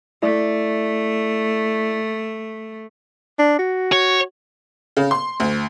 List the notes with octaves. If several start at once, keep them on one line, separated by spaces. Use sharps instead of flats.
A3 E4 D5
D4
F#4
C#5
C#3
C6
D2